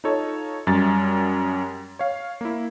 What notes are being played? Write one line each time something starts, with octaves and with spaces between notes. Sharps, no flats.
D#4 F4 A4 C#5 D#5
F#2 G3 A6
C#5 F5
A#3 E4